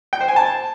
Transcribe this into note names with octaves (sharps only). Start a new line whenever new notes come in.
G5
C5
G#5
A5